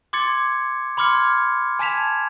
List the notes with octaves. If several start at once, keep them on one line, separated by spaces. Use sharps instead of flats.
C6 D6 G#6 A6 C#7
B5 C6 D6 F6 G#6 C#7
G#5 A5 G#6 B6 E7 F7